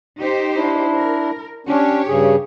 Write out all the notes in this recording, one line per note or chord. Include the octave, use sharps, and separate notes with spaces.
D#4 G4 C5
D4 E4
A#4
C#4 D4 G4 C#5
G2 C#3 G#4